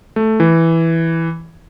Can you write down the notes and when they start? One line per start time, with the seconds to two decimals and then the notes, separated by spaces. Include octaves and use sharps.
0.16 A3
0.40 E3